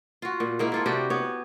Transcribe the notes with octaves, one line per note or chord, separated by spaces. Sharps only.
F4 F#4
A#2
G#2 A#3 E4
E4 F4 A4
C3 D4 F#4 G4
B3 C#5